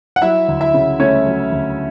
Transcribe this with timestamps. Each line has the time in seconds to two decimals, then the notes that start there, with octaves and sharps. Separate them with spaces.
0.16 F#5
0.22 F#3 E4 E5
0.49 D2
0.61 E4 E5
0.74 C#3
1.00 A3 C#4 C#5
1.26 F#3
1.52 D2